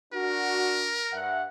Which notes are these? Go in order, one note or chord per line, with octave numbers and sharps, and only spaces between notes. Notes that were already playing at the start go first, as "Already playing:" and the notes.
D4 F#4 A#4
G2 E5 F#5